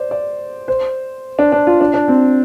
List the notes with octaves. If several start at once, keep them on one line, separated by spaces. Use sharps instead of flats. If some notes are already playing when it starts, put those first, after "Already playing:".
Already playing: C5 D5
D5
C5
D4
D4
F4
D4
D4
C4